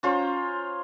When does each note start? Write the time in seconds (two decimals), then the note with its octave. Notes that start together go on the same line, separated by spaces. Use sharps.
0.03 C#4 F4 C5 A#5